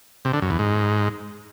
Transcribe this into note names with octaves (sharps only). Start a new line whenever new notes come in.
C3
D3
F#2
E2
G#2